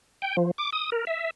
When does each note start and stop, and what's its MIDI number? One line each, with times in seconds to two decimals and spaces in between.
0.22 0.36 79
0.37 0.51 53
0.58 0.70 86
0.72 0.90 87
0.92 1.05 70
1.07 1.30 76